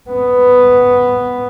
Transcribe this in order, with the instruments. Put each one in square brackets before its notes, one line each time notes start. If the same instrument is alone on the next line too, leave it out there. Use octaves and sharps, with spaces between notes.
[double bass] B3